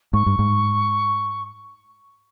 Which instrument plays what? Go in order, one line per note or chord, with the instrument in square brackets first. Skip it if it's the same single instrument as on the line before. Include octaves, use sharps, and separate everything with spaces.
[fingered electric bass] G#2 [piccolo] C#6
[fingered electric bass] G2
G#2